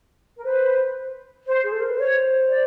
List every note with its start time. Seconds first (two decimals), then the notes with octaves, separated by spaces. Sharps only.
0.37 A#4
0.44 B4 C5
1.47 C5
1.63 G#4
1.72 A4
1.80 A#4
1.89 B4
1.98 C5 C#5
2.49 D5